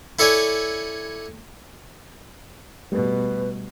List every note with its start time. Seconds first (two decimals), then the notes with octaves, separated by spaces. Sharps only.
0.19 E4 A4 C#5 D5 G#5
2.92 B2 G3 A3 B4